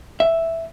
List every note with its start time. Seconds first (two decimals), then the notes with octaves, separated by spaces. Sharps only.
0.20 E5